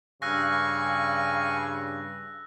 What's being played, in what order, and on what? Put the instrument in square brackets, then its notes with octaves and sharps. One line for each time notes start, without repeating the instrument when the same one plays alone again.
[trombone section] G2 C#3 [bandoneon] F5 G#5 C#6 [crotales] E6 F#6 A#6